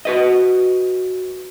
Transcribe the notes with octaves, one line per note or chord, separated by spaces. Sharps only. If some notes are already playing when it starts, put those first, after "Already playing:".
F#4 B4 D#5